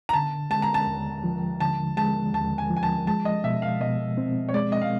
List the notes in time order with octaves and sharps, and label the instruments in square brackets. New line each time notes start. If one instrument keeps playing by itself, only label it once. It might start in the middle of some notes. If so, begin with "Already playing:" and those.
[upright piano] A#5
[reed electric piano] D3 [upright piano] A5
[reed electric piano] G#3 [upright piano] A5
[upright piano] A#5
A5
[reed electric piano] D#2
F3
[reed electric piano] D3 [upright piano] A5
[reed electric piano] G#3 [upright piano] A5
[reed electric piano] D#2 [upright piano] A5
[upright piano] G#5
[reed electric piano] F3
[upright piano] G#5
A5
[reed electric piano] G#3 [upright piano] A5
[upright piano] D#5
[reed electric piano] B2 [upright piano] E5
[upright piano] F5
[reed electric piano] B2 [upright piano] D#5
[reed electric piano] C4
[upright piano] C#5
[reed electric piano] G#3 [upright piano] D5
[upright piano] D#5
F5